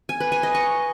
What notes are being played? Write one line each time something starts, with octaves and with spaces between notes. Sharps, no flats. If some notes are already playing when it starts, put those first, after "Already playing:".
G#5
B4
G#5
D#5
C#6